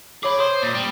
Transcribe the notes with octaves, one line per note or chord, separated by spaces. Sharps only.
G#4 C#5 B5 D6
C5 D#6
A#2
G3